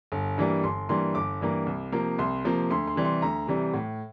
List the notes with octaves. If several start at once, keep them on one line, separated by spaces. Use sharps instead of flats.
G1
G2 E3 G3 A#3
G1 C6
G2 E3 G3 A#3 C6
G1 D6
G2 E3 G3 A#3
C2
C3 F3 A#3
C2 C6
C3 F3 A#3
D2 C6
C6
C3 E3 G3
C6
D2 A#5
C3 E3 G3
A2